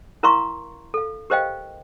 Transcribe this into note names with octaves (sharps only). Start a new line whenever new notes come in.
E4 A#4 F5 A#5 C6 C#6
A4 F5
G4 A#4 C5 D#5 F5 G5